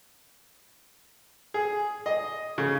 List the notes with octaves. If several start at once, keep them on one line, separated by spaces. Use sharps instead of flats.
G#4
D#5
C#3